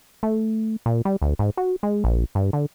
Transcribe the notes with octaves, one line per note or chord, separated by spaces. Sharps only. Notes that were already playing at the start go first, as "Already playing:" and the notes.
A3
A#2
G3
D2
G#2
F#4
G#3
A#1
G2
D3